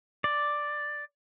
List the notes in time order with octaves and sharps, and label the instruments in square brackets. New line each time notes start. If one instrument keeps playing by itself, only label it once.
[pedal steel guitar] D5